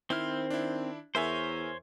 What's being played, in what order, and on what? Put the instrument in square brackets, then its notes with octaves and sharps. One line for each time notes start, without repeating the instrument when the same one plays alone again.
[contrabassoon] D#3 [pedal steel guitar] C4 C5 F6 [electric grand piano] E4
[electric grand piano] D4 E4
[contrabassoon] E2 [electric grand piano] A#4 E5 G#5 [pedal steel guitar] C5 C#5